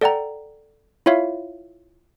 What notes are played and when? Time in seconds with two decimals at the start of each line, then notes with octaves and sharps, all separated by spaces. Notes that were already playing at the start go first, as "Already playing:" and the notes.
0.01 A4 D5 F#5 G5 A#5
1.06 E4 F4 C#5 E5 F5